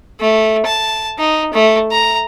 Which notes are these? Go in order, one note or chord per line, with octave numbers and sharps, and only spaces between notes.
A3
A5
D#4
A3
A#5